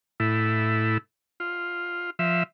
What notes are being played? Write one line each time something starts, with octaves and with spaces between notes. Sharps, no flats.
A2 E4
F4
F3 E5